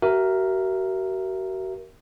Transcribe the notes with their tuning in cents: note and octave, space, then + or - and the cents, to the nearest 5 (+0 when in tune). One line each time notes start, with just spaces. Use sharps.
F#4 +40 A#4 +0 E5 +15